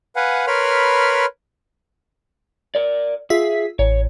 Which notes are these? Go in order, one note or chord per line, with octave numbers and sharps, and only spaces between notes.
B4 F5 F#5 G#5
A#4 B4 C#5 B5 C6 F6
A#4 D5
F4 G#4 E5 B6
A1 C#5